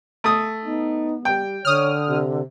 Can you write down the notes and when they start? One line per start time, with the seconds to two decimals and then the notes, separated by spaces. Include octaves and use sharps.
0.24 A3 D#6
0.65 B3 D#4
1.25 G3 G5
1.65 D3 C#5 D#6 F6
2.09 C3